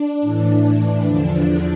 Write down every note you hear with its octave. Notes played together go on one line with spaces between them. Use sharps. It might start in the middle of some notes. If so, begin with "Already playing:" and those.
Already playing: D4
A2 E3
E2 D3 F3